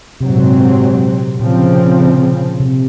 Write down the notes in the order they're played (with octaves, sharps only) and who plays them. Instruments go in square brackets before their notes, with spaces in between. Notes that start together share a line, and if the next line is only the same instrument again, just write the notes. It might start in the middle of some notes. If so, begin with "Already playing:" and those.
[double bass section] G#2 F#3 C4 [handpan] C3
[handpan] A#2
C3
[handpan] A#2 [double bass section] C#3 F3 C4
[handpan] C3